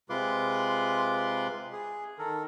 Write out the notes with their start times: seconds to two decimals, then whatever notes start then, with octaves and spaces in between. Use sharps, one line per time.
0.10 C3 G#3 F4 B4 C6 D6
1.73 G#4
2.19 D#3 A4 A#4